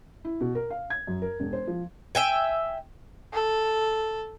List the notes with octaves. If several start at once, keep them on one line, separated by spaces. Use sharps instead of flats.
E4
B2
A#4
F5
G#6
F#2
A#4
E1
C5
F3
E5 G5 G#5
A4